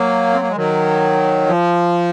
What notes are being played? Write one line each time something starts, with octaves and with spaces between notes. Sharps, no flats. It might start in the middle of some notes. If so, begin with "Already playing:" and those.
Already playing: F#3 A#3
C4
A#3
G#3
D#3 F#3
F3